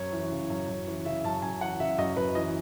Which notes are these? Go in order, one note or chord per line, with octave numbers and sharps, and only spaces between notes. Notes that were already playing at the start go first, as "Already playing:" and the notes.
Already playing: F#2 C#5
E3
C#3
F#2
F#2
E3
C#3 E5
F#2 A5
F#2 G#5
E3 F#5
C#3 E5
F#2 D#5
F#2 B4
E3 D#5